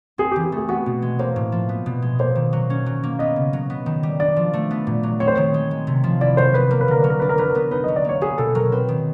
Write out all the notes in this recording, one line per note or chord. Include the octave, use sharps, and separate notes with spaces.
C4 G#4
G4
E3
G4
A3 G#4
B3 F#4
B2
G#3
A#3 C5
A2
F3
B3
B2
G#3
A#3 C5
D#3
F#3
C#4
F#3
A#3
B3 D#5
C#3
F#3
B3
D#3
G3
D4 D5
F3
A3
B3
A#2
F#3
C4 C#5
C5
D#3 C#5
G#3
G#3
C3
F3
E4 D5
F#3 C5
B3 B4
A#3 A#4
B4
D3 A#4
F#3 B4
A#4
D4 B4
A#4
F#3 B4
A#4
B3
D#4 B4
F#3 D#5
D5
A#3 C#5
B3 G#4
B2 A4
F#3 A#4
C4 B4
D#3